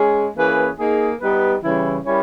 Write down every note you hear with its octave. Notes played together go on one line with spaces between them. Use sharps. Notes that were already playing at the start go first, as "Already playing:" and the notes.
Already playing: G#3 C#4 G#4
E3 A#3 C#4 G#4 B4
A#3 D#4 G#4
G3 B3 D#4 G4 B4
C#3 E3 G3 C#4 E4
G3 C#4 E4 A#4 C#5